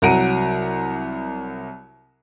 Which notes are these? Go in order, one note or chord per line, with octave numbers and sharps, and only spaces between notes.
C2 F#3 F#5 A#5 D7 D#7